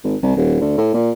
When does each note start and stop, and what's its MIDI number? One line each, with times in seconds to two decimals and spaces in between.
0.04 0.16 32
0.22 0.33 36
0.37 0.56 27
0.61 0.73 38
0.78 0.90 45
0.94 1.11 46